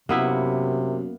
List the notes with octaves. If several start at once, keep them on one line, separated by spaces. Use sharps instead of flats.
F#2 C3 A#3 B3 E4